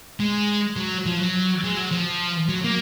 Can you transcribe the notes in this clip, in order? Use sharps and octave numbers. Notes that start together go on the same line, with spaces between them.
G#3
F#3
F3
F#3
G#3
F#3
F3
F#3
A#3